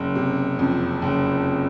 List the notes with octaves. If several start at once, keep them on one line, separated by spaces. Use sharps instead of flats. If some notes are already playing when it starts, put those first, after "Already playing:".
Already playing: F#1
C3
F2
F#1